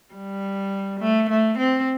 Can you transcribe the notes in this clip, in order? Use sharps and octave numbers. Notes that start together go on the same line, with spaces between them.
G3
A3
A3
C4